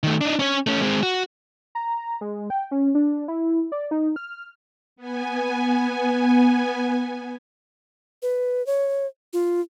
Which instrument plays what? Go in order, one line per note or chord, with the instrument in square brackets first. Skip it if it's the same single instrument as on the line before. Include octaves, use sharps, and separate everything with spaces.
[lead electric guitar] D#3 A3
D4 D#4
C#4 C#5
A3 C#4
G#3 C4
F#4
[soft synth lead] A#5
G#3
G5
C#4
D4
E4
D5
D#4
F6
[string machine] B3 G#5
[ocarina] B4
C#5
F4